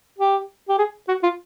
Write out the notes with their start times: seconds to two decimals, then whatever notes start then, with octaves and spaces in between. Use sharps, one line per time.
0.18 G4
0.69 G4
0.78 G#4
1.08 F#4
1.23 F4